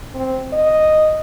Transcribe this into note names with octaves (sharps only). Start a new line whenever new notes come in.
C4
D#5